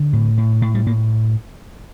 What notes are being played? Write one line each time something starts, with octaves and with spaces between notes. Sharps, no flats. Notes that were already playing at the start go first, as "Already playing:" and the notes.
Already playing: D3
A2
A2
A2 A3
G3
A2 A#3